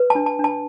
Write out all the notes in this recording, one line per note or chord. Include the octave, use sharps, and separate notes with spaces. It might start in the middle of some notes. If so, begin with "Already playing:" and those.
Already playing: B4
D4 A5
A5
D4
A5